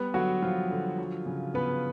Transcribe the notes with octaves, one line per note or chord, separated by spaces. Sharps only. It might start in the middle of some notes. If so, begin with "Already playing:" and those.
Already playing: G3 B3 B4
D3 F#3 F#4
F3 G3 F4
D3
F#3
C#3
C#3 B3 B4